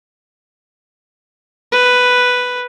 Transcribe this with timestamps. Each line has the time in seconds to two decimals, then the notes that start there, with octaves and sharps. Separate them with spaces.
1.72 B4